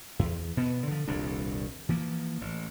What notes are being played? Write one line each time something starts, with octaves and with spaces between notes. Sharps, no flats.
E2
B2 B3
D3 F3
D#1 C2 F2 D4
E3 F3 A#3
A1